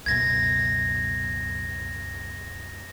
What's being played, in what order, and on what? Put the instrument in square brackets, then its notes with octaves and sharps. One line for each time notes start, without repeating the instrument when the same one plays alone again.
[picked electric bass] C#2 F#2 B2 [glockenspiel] G#6 A#6